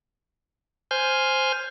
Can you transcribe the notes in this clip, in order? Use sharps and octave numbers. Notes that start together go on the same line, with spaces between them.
C5 G#5 F6 G6